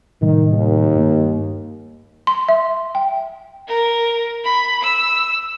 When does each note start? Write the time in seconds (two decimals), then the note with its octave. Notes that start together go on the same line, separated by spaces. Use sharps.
0.21 A2 C3 D#3 G3
0.53 D#2
0.95 G2 A#3
2.27 C6
2.49 E5
2.95 G5
3.68 A#4
4.44 B5
4.83 E6